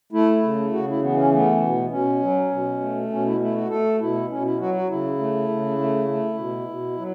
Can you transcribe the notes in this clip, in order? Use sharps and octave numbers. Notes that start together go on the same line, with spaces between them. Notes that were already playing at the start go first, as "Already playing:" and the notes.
A3 E4
C#3
C#3 F#4
E4
E3 B3
C#4
A3 B3
B2
B2 C#4
F#3
B2
A3
B2 C#4
E4
A3 E4
F#4
A3 A4
B2 E4
B2 C#4
E4
F#3 F#4
F#4
C#3 E4
A3
C#3
A3
A3
B2
B2
F#3